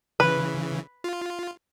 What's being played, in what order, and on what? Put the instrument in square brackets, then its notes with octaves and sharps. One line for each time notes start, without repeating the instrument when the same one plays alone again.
[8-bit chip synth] C#3 E3 [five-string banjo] B4
[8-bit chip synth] F4